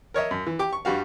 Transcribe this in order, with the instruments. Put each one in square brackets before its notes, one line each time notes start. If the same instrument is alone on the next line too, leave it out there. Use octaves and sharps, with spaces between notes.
[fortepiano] A#4 C#5 D#5 E5
F#2
E3
G4 D6
C#6
G2 G3 F#4 F5